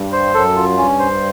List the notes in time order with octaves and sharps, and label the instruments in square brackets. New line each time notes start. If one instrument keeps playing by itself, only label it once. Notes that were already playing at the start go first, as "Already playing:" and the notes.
Already playing: [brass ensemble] G2
[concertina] C5
[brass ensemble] F#2 [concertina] A4
[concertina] F4
[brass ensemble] G2 [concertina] C#4
[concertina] C5